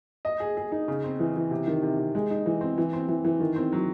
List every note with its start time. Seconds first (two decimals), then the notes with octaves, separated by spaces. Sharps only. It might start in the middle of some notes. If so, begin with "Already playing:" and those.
0.25 D#5
0.40 G#4
0.57 G#4
0.72 D#4
0.88 C#3
1.04 C4
1.19 E3
1.36 E3
1.51 C3
1.67 D#3
1.82 C3
1.98 C3
2.15 G#3
2.30 D#4
2.46 E3
2.61 C4
2.78 E3
2.93 C4
3.08 E3
3.24 E3
3.40 D#3
3.56 C4
3.72 F#3